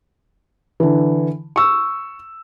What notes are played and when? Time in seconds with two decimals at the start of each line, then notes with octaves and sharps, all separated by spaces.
0.80 D3 E3
1.56 C#6 E6